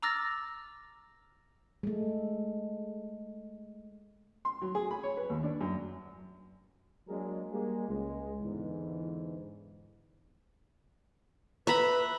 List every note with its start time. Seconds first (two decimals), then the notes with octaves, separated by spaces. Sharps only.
0.03 A#5 D6 E6 F6 A6 A#6
1.83 G#3 A3
4.45 C6
4.62 F#3
4.75 G#4
4.91 B5
5.03 C#5
5.17 B4
5.30 D#2
5.43 D4
5.61 F#2
7.09 F#3 G#3 A#3 D4 G#4 A#4
7.51 G3 G#3 A#3
7.88 C#2 G#3
8.42 E2 G#2 D3 E3
11.67 B4 E5 A#5 B5